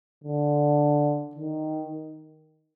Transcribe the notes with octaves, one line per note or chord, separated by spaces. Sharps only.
D3
D#3